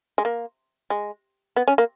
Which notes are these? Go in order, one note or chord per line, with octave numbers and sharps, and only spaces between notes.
G#3
A#3
G#3
B3
C#4
A#3